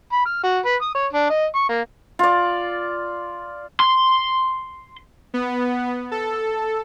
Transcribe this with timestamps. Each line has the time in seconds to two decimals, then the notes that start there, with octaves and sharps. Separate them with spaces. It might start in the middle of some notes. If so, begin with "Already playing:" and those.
0.12 B5
0.26 F6
0.43 F#4
0.65 B4
0.82 D#6
0.95 C#5
1.13 D4
1.30 D#5
1.55 C#6
1.69 A#3
2.19 F4 D5
3.80 C6
5.34 B3
6.11 A4